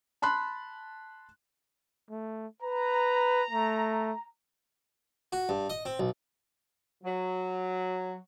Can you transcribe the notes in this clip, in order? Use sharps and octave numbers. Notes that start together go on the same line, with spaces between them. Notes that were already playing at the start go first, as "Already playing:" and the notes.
A5 B5 C6 F#6
A3
B4 A#5
A3
F#4
G2
D#5
C4
B1
F#3